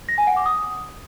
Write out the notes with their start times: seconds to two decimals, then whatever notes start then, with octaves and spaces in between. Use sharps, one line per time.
0.09 A#6
0.18 G#5
0.27 F#5
0.36 D6
0.46 D#6